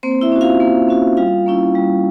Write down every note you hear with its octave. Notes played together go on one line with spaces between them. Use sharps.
A#3 C4 C5
E4 E5
C#4 F#4
F4 F5
A#3
C#4 F#4
G3 F4 F5
A#3 C#4 E4
G3